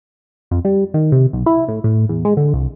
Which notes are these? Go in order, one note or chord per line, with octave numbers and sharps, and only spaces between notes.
F2
G3
D#3
C3
B1
E4
A2
A2
E2
G#3
D3
C2